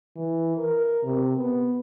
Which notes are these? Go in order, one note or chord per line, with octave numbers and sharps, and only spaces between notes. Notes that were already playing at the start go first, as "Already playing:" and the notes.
E3
A#4
C3
B3